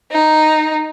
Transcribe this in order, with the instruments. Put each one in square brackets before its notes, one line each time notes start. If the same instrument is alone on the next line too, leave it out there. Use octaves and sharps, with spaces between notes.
[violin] D#4